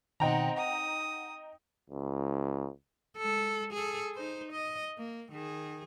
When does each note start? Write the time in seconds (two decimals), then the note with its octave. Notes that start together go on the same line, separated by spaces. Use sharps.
0.20 B2 D#3 C4 D#4 F#5 G5 A#5
0.57 F#5 D#6
1.90 C#2
3.17 G#3 A4
3.73 G#4 A4
4.15 D#4 C5
4.52 D#5
4.98 A#3
5.32 D#3 G#4